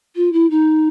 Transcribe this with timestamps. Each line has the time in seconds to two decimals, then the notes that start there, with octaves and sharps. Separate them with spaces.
0.16 F4
0.33 E4
0.50 D#4